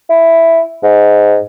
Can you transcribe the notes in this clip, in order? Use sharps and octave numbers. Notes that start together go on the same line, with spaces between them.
E4
G#2